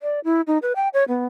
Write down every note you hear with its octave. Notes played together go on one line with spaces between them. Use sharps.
D5
E4
D#4
B4
G5
C#5
B3